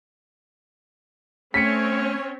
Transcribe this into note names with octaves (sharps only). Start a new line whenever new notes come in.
A3 C4 C#4 C#5 B6 C#7